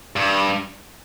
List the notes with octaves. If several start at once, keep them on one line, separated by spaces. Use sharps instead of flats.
G2